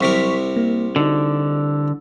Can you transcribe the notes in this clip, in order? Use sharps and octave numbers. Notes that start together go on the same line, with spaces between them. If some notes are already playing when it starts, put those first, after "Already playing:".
C2 C3 F#3 A#4 C#6 B6
A#3
D3 D#4 F#4